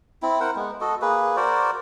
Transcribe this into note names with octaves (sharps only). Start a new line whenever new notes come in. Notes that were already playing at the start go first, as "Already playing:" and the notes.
C4 E4
A#4 C5 F#5
G#3 B3
F#4 A4 D#5
A#3 G#4 B4
F#4 A#4 C5 D5